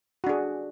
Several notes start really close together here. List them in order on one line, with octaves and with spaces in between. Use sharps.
F#4 D4 G#4